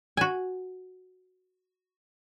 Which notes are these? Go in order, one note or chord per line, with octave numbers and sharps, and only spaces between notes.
F#4 G#5